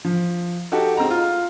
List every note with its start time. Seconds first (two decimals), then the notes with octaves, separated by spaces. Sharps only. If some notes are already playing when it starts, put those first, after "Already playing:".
0.05 F3
0.72 D#4 F#4 G4 A4
0.97 G#3 C4 D#4 A#5
1.10 F4